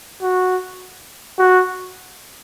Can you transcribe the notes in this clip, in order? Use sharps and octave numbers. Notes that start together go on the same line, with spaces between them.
F#4
F#4